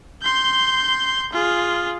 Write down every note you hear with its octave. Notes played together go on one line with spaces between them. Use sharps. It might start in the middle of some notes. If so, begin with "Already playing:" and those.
C6 G6
F4 G#4